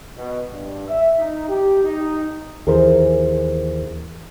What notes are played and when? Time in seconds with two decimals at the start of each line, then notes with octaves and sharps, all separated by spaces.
0.18 B2
0.51 G2
0.88 E5
1.18 D#4
1.48 G4
1.84 D#4
2.67 D#2 E3 G#4 A#4 C5